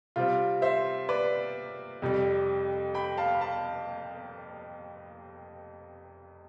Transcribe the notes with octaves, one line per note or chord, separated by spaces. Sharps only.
C3 G3 C4 F4
C5 E5
B4 D5
F2 C3 G3
G5 B5
F5 A5
B5
F5 A5